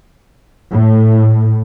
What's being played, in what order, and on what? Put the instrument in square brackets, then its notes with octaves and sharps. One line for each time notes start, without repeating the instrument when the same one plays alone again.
[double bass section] A2